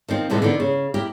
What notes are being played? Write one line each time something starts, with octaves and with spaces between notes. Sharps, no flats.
D#3 F3 C4
A2 C3 E3 F3 G#3
D3 D#3 B3 D#4
C#3
E4 G4 A#4